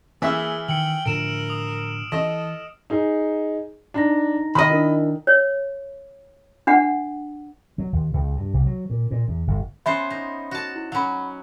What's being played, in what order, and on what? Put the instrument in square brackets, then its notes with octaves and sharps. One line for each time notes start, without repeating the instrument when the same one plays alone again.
[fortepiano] E3 E5 [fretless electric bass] A#3 [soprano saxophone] G#4 [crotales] E6 F6
[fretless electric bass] D#3 [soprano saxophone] G5 [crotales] C#7 F#7
[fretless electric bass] A2 D3 F3 [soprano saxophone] A#4 [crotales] D7 E7
[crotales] D#6
[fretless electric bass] E3 [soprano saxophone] A4 [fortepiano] D#5
[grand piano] D#4 G#4
[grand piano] D4 [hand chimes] D#4 A#5 A#6
[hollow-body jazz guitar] D#3 D#5 [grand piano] B5
[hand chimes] D4 E4 A#4
[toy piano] C#5
D4 F#5
[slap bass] F#3
D#2
C#2
G2
C2
F#3
A#2
A#2
E2
G1
[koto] B3 C#4 C5 [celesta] E5 B5 C6
[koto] D#4
F#4 A5
[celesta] E4
[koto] F#3 C#4 [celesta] F#5 B5